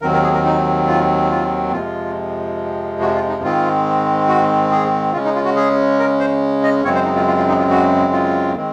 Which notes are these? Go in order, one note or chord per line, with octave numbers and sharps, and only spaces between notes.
D#2 D#3 F#3 C4 A#4
A#4
G#4
A#4
D#4
F4
F4
F2 C3 F3 G#3 F4
F#4
F4
D#4
G#2 D#3 G#3 C4 F4
F#4
G#4
C#3 G#3 C#4 F4
D#4
F4
F#4
G#4
A#4
C5
D#5
F#2 C#3 G#3 C4 C#5
C5
D#4
F4
F4
F4
D#4
F4
F#4
F4
D#3 G#3 C4